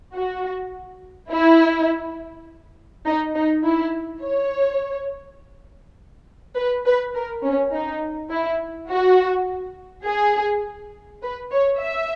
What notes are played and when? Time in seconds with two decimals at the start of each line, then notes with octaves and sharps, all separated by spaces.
0.15 F#4
1.31 E4
3.06 D#4
3.35 D#4
3.64 E4
4.22 C#5
6.56 B4
6.85 B4
7.15 A#4
7.44 C#4
7.73 D#4
8.31 E4
8.90 F#4
10.05 G#4
11.22 B4
11.51 C#5
11.80 E5